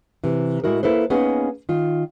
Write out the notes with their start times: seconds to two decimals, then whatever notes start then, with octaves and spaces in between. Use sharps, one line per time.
0.24 C3 E3
0.64 A2 G#3 E4 F#4 A#4
0.83 A#3 E4 A4 B4 C5
1.10 A#3 B3 C#4 D#4 G#4 B4
1.69 D#3 F4